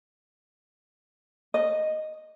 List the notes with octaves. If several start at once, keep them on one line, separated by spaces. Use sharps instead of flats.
D#5